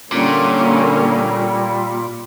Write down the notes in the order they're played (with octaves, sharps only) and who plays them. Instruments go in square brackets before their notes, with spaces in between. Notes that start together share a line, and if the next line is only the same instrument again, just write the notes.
[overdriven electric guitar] A#2 [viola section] D3 A#3 C#4 [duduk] G3